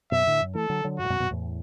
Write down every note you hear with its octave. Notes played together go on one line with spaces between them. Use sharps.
F#2 B2 E5
A2 D3
F#2
E3 A3 A4
D3 F#3
D3 F#3
F#2 F#4
A2
F#2 B2
F#2 B2
E2 A2